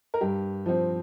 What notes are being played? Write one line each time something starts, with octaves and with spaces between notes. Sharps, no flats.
A#4
G2 G4
F3 C4